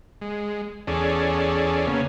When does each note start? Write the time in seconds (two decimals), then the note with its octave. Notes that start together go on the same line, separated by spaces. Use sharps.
0.21 G#3
0.87 E2 C#4 G#4 A4 D5
1.87 C#3 A#3 B3 C#4